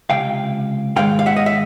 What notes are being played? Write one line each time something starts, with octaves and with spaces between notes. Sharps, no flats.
C#2 C3 F5 G5
G#2 D#3 G#3 F5 G5
F5
E5 F#5
D#5
E5